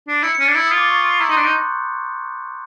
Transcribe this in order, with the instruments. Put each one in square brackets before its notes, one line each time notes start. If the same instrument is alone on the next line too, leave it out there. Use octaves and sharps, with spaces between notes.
[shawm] D4
[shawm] E4 [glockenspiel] C#7
[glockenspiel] C#7
[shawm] C#4
[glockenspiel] A6
[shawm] D4
[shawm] E4 [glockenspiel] G#6
[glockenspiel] D#6
[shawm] F4
[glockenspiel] D6
C#6
C6
[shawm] E4 [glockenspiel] A#5
[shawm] D#4 [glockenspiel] C6
[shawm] D4 [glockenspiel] F#6
[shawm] D#4 [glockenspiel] G6